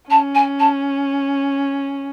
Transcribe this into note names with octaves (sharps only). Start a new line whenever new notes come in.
C#4 A5
G#5
A5